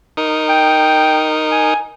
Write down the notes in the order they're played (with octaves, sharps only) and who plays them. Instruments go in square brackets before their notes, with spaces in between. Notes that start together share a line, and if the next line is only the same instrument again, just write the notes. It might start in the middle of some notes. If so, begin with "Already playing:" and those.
[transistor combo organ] D#4 A#4
[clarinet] G5
G#5